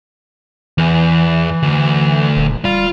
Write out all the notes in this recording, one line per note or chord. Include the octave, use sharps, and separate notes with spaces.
E2 E3
D2
D#1
G3 F4